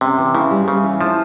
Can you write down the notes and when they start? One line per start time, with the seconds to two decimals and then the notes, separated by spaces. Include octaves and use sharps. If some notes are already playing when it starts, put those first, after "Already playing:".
0.01 C3 C#4
0.18 E3
0.34 C#3 E4
0.51 G3
0.67 C#3 C#4
0.84 E3
1.00 F3 E4